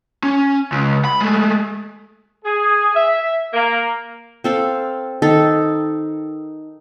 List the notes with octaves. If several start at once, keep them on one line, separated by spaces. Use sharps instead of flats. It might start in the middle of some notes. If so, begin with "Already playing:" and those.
C#4
C#2
B5
G#3 A3
G#4
E5
A#3
C4 A4 F5
D#3 D#4 A4